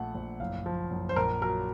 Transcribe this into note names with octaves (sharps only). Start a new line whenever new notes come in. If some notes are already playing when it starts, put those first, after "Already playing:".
Already playing: A#1 A3 F#5
A#1
F#1 F5
F3
F#1
C5
A#1 A#4
F#3 A#4